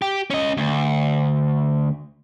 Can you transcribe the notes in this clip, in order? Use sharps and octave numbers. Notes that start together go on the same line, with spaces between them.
G4
C#4 D#5
D2